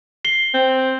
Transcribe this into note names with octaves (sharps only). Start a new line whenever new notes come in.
C7 G7
C4